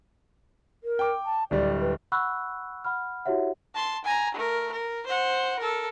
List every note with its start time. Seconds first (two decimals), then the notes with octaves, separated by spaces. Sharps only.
0.84 A#4
0.99 G5 D6
1.25 A5
1.51 D1 G3 D5
1.81 B4
2.12 F#5 B5 C#6 E6 F#6
2.85 F#5 B5 F6
3.26 E4 F#4 G4 C#5 E5 F#5
3.75 A5 C6
4.04 G#5 A#5
4.35 A3 A#4
4.72 A#4
5.06 C5 F#5
5.59 A4 A#4